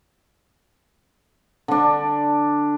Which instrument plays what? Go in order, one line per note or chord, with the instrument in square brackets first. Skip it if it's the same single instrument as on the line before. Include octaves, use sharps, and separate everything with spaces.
[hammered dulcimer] D3 D4